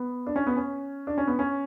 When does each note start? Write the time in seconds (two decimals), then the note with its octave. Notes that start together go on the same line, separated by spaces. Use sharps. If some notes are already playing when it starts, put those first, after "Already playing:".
Already playing: B3
0.26 D4
0.36 C#4
0.47 B3
0.56 C#4
1.07 D4
1.18 C#4
1.27 B3
1.39 C#4